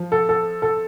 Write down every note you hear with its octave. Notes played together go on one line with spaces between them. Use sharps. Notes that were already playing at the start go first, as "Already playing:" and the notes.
Already playing: F3
A4
A4
A4